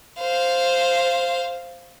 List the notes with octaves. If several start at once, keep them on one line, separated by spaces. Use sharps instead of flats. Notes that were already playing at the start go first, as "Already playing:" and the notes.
C5 F5